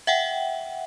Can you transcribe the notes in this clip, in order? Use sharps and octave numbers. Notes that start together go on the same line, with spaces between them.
E5 F#5 G5